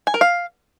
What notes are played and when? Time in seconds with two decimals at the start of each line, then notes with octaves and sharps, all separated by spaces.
0.07 G#5
0.14 A#4
0.21 F5